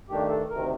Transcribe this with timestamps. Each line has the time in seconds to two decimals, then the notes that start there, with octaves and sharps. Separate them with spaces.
0.09 G2 D#3 A3 D4 G4
0.29 A4
0.50 D2 C3 D#3 A#4